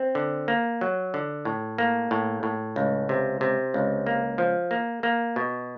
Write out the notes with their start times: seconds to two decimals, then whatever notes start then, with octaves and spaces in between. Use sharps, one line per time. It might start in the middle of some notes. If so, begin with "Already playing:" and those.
Already playing: C4
0.15 D3
0.48 A#3
0.81 F#3
1.14 D3
1.45 A2
1.78 A#3
2.11 A2
2.43 A2
2.76 C#2
3.09 C3
3.41 C3
3.74 C#2
4.06 A#3
4.38 F3
4.71 A#3
5.03 A#3
5.36 B2